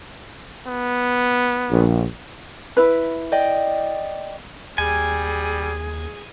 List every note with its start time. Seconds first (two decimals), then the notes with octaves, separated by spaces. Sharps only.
0.67 B3
1.71 A#1
2.77 E4 B4
3.32 D5 D#5 G5
4.78 D#2 G3 G#4 G#5